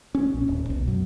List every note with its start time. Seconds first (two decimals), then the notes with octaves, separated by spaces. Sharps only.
0.15 C#4
0.34 A#1
0.48 D#1
0.70 B1
0.88 F#2